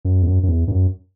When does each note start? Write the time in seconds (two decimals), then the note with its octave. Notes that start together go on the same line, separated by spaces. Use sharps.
0.05 F#2
0.23 E2
0.27 F#2
0.43 F#2
0.49 E2
0.68 G2
0.71 F#2